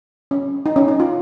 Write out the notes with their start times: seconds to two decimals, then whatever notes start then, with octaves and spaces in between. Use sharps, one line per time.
0.31 C#4
0.66 D#4
0.76 C#4
0.88 D#4
1.00 F4